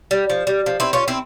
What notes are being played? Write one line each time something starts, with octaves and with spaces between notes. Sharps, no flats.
G3
F3
G3
F3
C4 E4
C#4 F4
C4 E4